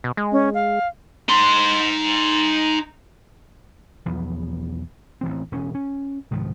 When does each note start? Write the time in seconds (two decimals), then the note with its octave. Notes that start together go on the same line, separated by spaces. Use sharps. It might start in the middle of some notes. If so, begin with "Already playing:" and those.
0.04 B2
0.17 G#3
0.32 C#4
0.54 F5
1.29 D#4 C6
4.06 B1 E2 F3 B3
5.21 A1 E3 C4
5.52 E1 C#4
5.75 C#4
6.31 C2 G#2 D#3 F3